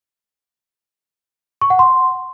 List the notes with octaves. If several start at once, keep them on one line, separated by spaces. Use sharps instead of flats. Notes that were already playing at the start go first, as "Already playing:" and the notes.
C#6
F#5
C6